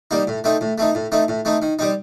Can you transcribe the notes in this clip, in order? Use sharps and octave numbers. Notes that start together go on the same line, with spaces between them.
G3 A#3 D#4
A2
A3 C4 D#4
A2
A3 C4 D#4
A2
A3 C4 D#4
A2
A3 C4 D#4
D#3
G3 C4 D#4